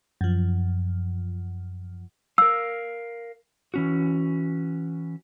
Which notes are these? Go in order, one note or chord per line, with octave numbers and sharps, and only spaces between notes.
F#2 F3
A#4 F5 E6
E3 C#4 F#4